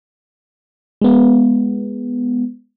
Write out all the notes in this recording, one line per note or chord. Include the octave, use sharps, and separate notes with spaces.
G#3 B3